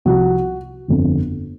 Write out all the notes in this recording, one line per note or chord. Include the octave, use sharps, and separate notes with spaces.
C2 C3 F3 F#4
G1 F2 D3